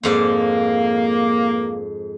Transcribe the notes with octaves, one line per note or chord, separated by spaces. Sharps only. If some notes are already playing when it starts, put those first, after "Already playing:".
F2 G#2 A#3 D5